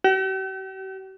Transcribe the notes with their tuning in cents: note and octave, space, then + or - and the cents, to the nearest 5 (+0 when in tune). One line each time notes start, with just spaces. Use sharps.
G4 -45